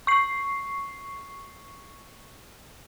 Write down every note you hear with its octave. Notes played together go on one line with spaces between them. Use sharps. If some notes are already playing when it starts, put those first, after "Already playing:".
C#6 C7